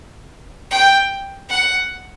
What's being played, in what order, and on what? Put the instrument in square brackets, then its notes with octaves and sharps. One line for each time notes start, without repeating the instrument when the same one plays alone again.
[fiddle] G5
F#5